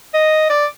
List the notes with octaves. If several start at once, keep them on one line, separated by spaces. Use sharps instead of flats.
D#5
D5